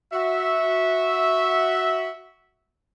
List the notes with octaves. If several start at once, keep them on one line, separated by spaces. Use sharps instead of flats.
F#4 E5